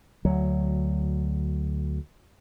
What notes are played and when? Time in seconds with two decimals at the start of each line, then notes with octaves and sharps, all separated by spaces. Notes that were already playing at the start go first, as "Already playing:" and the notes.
0.25 D2 F#3